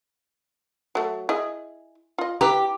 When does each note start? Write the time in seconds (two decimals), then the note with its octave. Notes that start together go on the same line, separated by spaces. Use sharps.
0.95 F#3 A3
1.29 E4 G#4 D#5
2.18 F4 D#5
2.41 E4 G4 B4 A#5